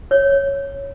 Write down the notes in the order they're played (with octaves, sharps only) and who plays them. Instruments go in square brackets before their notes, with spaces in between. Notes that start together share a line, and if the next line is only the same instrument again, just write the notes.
[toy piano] C#5